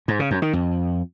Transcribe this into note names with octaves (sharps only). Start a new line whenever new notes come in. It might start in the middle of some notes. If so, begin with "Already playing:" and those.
G#2
C#3
F#2
D#3
F2